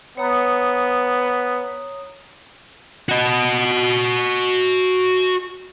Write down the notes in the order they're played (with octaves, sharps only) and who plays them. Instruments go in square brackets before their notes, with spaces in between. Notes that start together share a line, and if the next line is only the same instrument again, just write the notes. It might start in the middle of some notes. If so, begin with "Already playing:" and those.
[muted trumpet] B3 [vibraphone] C#5 A#5 D#6
[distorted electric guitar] F#4 D#5